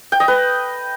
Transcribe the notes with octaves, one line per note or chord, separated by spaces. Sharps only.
G5
D#5
B4